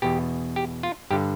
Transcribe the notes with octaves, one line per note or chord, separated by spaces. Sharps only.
E2 B2 G4
G4
F4
G2 D3 G4